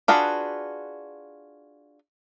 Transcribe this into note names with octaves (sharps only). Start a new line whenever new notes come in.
D4 F4 F#4 G#4 B4